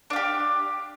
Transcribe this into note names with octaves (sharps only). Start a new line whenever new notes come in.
D4 G4 F5